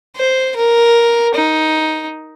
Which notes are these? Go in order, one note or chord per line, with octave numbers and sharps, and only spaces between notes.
C5
A#4
D#4